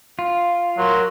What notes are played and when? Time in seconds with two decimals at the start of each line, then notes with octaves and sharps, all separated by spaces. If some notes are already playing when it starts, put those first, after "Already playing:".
0.19 F4
0.77 F#3 A#4 C6